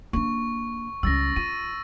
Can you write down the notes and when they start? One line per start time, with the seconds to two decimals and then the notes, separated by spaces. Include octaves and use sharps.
0.13 A#3 D4 C#6
1.03 C#2 G3 E6 A6 A#6
1.36 F4 D#7